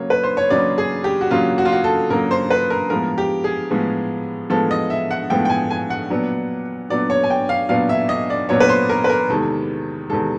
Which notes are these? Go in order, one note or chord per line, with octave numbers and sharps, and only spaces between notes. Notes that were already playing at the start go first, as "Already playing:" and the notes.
Already playing: C#3 F#3 A#3 C#5
B4
C5
C#5
C#3 F#3 A#3 D5
G#4
G4
F#4
C#3 F#3 A#3 F4
F#4
F4
F#4
A4
C#3 F#3 A#3 A#4
C5
B4
A#4
A2 F3 G#3 B3 A#4
G4
G#4
A2 F3 G#3 B3
A2 F3 G#3 B3 A4
D#5
E5
F#5
A2 F3 G#3 B3 G5
G5
G#5
G#5
F#5
A#2 F#3 B3 D4
A#2 F#3 B3 D4 D5
C#5
G#5
G5
F5
A#2 F#3 B3 D4 F5
E5
D#5
D5
A#2 F#3 B3 D4 C#5
B4
C5
A#4
B4
A#4
E2 C3 D#3 G#3 A4
E2 C3 D#3 G#3 A4